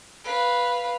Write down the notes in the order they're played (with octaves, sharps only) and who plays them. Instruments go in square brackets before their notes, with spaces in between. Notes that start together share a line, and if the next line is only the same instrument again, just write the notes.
[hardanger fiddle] B4 F5